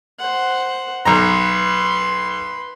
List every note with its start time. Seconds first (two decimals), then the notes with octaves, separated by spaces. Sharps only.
0.19 C5 F#5
1.05 B1 B4 A#5 C6